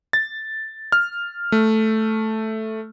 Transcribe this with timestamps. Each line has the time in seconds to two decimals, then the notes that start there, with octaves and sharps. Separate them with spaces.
0.13 A6
0.92 F6
1.52 A3